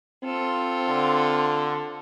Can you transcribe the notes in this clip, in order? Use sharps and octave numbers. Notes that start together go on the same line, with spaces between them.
C4 F4 A4
D3